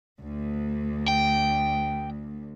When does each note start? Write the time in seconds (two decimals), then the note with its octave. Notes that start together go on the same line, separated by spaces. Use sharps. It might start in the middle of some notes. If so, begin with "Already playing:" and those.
0.21 D2
1.08 G5